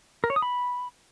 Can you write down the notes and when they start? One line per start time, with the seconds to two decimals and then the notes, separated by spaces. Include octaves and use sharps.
0.24 A#4
0.30 C#5
0.36 D#6
0.42 B5